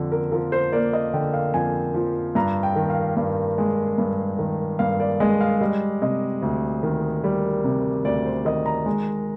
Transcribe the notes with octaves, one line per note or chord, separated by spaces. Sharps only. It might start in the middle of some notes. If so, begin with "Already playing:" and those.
Already playing: F2 D3
A#4
F3 A#4
C5
A#3 D5
D#5
D3 G5
F5
F2 G#5
F3
G2 A#5
G5
D#3
F5
G2
G#3
G2
D#3
G2 F5
D5
G#3 D#5
F5
G3 D#5
C3 D#5
D2
D#3
G3
C3
D2 D5
C5
D#3 D#5
A#5
G#3